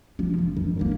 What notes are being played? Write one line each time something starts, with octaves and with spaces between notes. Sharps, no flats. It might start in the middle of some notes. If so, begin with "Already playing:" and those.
C3 F3
F1
F2
A#3 E4